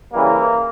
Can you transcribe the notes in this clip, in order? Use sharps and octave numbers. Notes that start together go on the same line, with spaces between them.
C#3 E3 G3 A#3